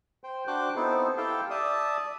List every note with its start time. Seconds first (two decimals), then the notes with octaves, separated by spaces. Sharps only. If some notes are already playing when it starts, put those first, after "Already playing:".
0.24 C5 G5
0.47 D4 F#4 C5 G5 D6 F#6
0.76 B3 C4 D#4 E4 A4 C5
1.17 E4 G4 A4 F5 G5 A5
1.50 D5 E5 A5 D#6